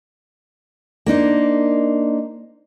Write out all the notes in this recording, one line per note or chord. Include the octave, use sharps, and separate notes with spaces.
A#3 D4 D#4 C5